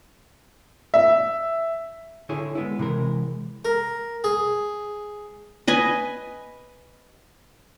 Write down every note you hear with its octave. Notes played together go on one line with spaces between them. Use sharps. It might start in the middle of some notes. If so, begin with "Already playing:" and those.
E5
D3 E4 G#4 C#5
G#3 B3 E4
C3 E3 G#3 A#4
A#4
G#4
B4 D#5 G#5